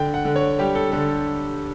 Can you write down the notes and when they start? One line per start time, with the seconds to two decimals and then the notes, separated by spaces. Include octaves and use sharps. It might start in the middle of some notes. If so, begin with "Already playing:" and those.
Already playing: D3 G5
0.14 F#5
0.25 D3
0.36 C#5
0.59 G3 G4
0.75 A4
0.92 D3 A4